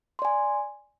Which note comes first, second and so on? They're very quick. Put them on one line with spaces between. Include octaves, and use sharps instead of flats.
C6 D5 G#5